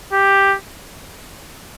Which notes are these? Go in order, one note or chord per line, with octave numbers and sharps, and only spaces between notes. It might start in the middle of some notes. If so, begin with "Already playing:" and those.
G4